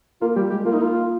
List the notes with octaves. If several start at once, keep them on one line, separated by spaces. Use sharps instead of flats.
A#3 F4
G3 G4
G#3 G4
A#3 F4
D#4
A#3 F4